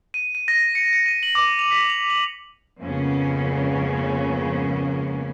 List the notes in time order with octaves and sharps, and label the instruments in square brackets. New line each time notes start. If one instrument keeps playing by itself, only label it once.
[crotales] D#7
D#7
A#6
C#7
C#7
D#7
F#7
D6
F7
B6
F7
F#7
[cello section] F2 G#2 C#3 A#3 B3 C#4